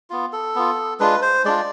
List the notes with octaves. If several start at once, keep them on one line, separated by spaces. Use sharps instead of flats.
B3 F4
A4
B3 F4
G#3 D4 F4 B4
C5
G#3 D4 F4 D5